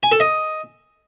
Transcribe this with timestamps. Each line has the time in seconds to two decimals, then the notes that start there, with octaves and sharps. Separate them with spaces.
0.03 G#5
0.12 A4
0.20 D#5